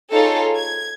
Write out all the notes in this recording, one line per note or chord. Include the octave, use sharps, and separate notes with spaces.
D#4 F4 G#4 A4 C#5
G#6